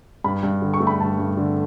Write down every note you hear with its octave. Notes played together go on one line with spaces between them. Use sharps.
G2 B5
G2
D3
C#6
A3
B5
G2 A5
G2
D3